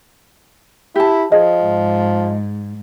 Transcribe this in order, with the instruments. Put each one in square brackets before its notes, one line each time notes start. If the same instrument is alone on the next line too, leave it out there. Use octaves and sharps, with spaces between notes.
[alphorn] E4 [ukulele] G4 A5
[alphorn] F3 [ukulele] G#4 [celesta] D#5
[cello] G#2